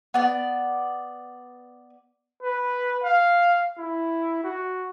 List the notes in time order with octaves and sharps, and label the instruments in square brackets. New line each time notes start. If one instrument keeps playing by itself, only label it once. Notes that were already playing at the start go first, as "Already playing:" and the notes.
[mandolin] B3 D5
[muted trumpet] B4
F5
E4
F#4